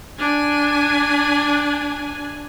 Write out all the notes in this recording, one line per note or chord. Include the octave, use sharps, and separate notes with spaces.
D4 G#5